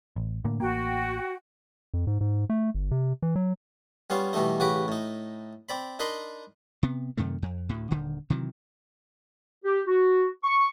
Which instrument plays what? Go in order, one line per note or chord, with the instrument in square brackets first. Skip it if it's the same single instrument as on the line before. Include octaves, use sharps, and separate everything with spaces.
[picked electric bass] A1
A2 D3 A#3
[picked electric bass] A1 A#3 [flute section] F#4 G5
[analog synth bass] F2
G#2
G#2
A3
G1
C3
E3
F#3
[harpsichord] G3 B3 C#4 F4 F5
B2 E3 G3 A3 D#4
A1 C#3 F#4 G4 B4 D6
A2 D#4
C4 D5 B5
D4 D#4 A#4 D#5 B5 C6
[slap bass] C3 B3
F#2 C3 D#3 A3
F2
D2 A2
D#1 D3 D#3
C3 D#3 E3 F#3
[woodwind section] G4
F#4
C#6